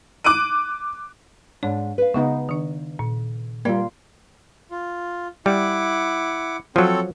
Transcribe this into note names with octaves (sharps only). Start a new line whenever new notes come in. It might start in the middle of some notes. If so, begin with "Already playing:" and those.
D6 F#6 D7 D#7
G#2 D4 C#5
B4 F5
C#3 G#3 B3 D#4
D#3 D4
A#2
G3 A#3 F4 A#4 D5 G5 G#6
F4
G3 E4 F#5 D6
F3 F#3 C4 A4 C#5